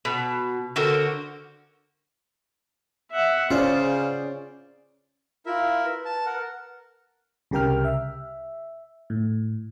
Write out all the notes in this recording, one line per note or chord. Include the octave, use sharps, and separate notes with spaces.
B2
D3 F#4 A#4 C5
E5 F#5
C#3 C#4 F4 C5 D5
E4 F4 A#4 E5
B4
A5
A#4 F#5
C2 C#3 G4 A#4 G5 F6
E5
A2